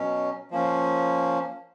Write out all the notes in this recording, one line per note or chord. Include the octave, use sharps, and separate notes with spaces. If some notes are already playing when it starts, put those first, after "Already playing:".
Already playing: B2 F#3 C#4
F3 A#3 C#4